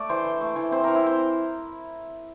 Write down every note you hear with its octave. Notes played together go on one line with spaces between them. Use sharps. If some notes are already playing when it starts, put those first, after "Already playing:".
Already playing: A3 D5
E3 C5
E3
A3
E3
C4 C5
E3 A#4
E4
C4 C5